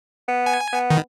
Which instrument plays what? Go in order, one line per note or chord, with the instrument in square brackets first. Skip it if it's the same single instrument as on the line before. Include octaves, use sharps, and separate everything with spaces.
[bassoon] B3
[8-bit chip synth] G#5
[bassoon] B3
[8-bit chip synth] D#3